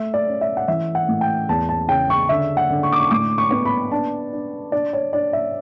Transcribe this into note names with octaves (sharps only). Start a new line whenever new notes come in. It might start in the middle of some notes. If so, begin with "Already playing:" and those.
Already playing: A3 E5
D5
C#4
E5
F#5
E3 E5
F#5
A2
G5
E2 A5
A5
C#3 G5
C#6
D3 E5
F#5
D3
C#6
D6
C#6
A2 D6
C#6
B3
B5
D4 A5
D4
D4 D5
C#5
D4 D5
E5